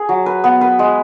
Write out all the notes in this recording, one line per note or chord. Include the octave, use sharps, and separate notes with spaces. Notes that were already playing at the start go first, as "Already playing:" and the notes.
Already playing: G#4
F#3
B4
B3
B4
G#3